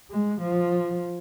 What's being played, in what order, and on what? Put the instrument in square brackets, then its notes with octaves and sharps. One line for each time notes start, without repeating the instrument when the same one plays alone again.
[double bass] G#3
F3